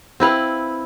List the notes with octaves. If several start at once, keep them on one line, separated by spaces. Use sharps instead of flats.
C4 E4 B4 F5